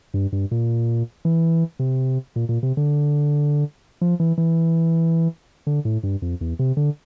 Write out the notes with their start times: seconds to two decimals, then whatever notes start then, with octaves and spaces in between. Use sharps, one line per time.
0.14 G2
0.32 G2
0.51 A#2
1.25 E3
1.79 C3
2.36 A#2
2.49 A#2
2.63 C3
2.77 D3
4.01 F3
4.20 E3
4.38 E3
5.67 D3
5.85 A2
6.03 G2
6.22 F2
6.41 E2
6.59 C3
6.77 D3